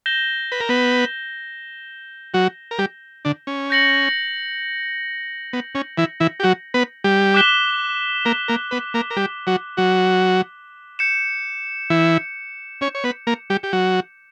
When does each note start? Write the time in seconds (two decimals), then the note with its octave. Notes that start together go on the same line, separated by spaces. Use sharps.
0.06 G6 A#6 E7 G7
0.52 B4
0.60 A#4
0.69 B3 B4
2.34 F#3 F#4
2.71 A#4
2.79 G3 G4
3.25 D3 D4
3.47 C#4
3.70 G6 A#6 C#7 F#7
5.53 B3
5.75 C#4
5.98 E3 E4
6.20 E3 E4
6.40 G4
6.43 F#3 F#4
6.74 B3 B4
7.04 G3 G4
7.34 D6 F#6 B6 E7 G7
8.25 A#3 A#4
8.48 A#3 A#4
8.71 B3 B4
8.94 A#3 A#4
9.10 A#4
9.16 G3 G4
9.47 F#3 F#4
9.77 F#3 F#4
10.99 G6 C#7 E7
11.90 E3 E4
12.81 C#4 C#5
12.95 C#5
13.04 B3 B4
13.27 A#3 A#4
13.50 G3 G4
13.63 G4
13.73 F#3 F#4